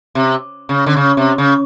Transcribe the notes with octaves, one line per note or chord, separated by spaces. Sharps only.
C3
C#3
D3
C#3
C3
C#3